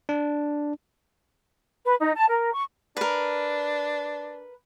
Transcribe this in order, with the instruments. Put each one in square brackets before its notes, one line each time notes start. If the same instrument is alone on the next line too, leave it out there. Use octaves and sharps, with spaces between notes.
[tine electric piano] D4
[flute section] B4
D#4
A5
A#4
C#6
[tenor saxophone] D4 [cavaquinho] A#4 B4